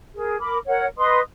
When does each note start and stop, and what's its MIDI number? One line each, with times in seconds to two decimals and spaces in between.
0.14 0.36 68
0.14 0.36 70
0.40 0.57 70
0.40 0.57 83
0.40 0.57 86
0.66 0.85 70
0.66 0.85 73
0.66 0.85 78
0.97 1.19 71
0.97 1.19 75
0.97 1.19 84
0.97 1.19 87